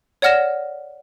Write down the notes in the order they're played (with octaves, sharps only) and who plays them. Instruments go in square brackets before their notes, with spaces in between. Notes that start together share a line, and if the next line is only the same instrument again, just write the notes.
[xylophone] C#5 D5 F#5 F6 A#6 E7